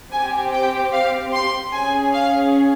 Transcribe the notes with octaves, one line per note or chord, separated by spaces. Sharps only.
C4 G4 G#5
G5
F5
C6
C#4 G#4 G#5
F5